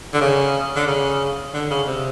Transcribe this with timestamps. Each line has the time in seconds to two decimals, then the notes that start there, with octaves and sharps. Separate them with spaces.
0.14 D3
0.21 C#3
0.76 D3
0.87 C#3
1.54 D3
1.70 C#3
1.87 C3